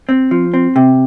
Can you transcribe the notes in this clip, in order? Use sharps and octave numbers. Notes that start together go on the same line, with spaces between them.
C4
F3
C4
C3